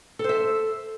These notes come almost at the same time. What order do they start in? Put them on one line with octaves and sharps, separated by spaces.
A4 C5 E5